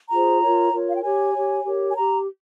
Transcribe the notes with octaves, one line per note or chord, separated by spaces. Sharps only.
F4 G#4 C5 A#5
F4 A#4 C#5
F4 A#4 C#5
F5
G5
G4 C#5 G#5
G4 C#5
G4 A#4 C#5
G#5
G4 A#5